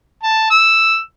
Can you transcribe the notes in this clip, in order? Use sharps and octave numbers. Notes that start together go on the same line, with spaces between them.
A5
E6